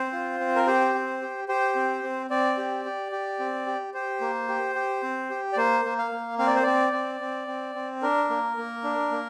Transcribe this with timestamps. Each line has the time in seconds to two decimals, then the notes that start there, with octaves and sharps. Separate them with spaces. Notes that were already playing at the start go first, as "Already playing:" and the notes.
Already playing: C4 C5
0.12 F4
0.40 C4
0.55 A#4
0.67 G4 C5
0.95 C4
1.22 G4
1.49 G4 C5
1.75 C4
2.03 C4
2.30 C4 D5
2.58 G4
2.85 G4
3.12 G4
3.39 C4
3.66 G4
3.94 G4 C5
4.21 A#3
4.48 G4
4.75 G4
5.03 C4
5.30 G4
5.53 D5
5.57 A#3 C5
5.85 A#3
5.98 F5
6.12 A#3
6.39 C4 F5
6.47 D5
6.55 C5
6.63 C4 D5
6.93 C4
7.21 C4
7.48 C4
7.75 C4
8.02 D4 A#4
8.30 A#3
8.57 A#3
8.84 D4
9.11 A#3